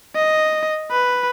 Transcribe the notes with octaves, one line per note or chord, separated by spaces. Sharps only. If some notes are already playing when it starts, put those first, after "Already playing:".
D#5
B4